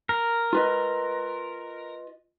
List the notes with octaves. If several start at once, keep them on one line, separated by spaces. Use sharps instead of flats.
A#4
F4 B4 D#5